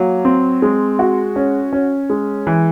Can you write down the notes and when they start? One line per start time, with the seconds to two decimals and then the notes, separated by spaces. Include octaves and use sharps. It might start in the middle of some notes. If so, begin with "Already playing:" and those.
Already playing: F#3 A#3
0.25 C4
0.62 G#3
0.99 F#4
1.36 C#4
1.73 C#4
2.10 G#3
2.47 E3